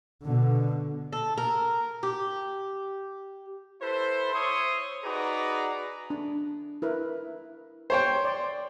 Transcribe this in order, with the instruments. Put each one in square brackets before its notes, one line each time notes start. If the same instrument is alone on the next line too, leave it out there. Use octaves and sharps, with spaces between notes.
[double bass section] B2 D3
[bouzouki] A4
A#4
G4
[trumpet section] E4 A4 B4 C5
C5 C#5 E5 C6 C#6 D#6
D#4 F#4 G#4 B4 D5 A#5
[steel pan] D4
E4 A#4 B4
[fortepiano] C5 C#5 G5
[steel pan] D5 C6